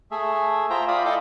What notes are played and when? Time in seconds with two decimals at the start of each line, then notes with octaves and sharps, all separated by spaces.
0.11 A3 G#4 E5
0.70 F4 C5 E5 G5 A#5
0.88 F4 D5 F5 B5 D#6
1.05 E4 A4 D5 D#5 G5 D6